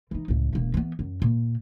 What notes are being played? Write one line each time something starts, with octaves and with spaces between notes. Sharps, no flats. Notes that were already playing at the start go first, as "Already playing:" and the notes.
E3 D#4
C#2 A2
E1 A#3
E3 B3
F#2
A#2